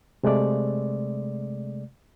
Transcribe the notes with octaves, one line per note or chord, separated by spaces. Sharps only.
C3 G#3 A3 D5